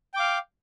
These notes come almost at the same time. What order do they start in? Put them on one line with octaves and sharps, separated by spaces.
G5 D6 F5